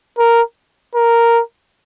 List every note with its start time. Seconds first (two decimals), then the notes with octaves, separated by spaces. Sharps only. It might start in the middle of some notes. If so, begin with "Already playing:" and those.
0.18 A#4
0.95 A#4